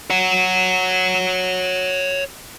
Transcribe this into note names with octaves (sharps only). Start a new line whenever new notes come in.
C#5 F#5